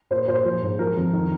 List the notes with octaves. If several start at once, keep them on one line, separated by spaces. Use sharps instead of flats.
A#2 C5
A#2 C5
F3
G#2
F3 A#4
F2
D#3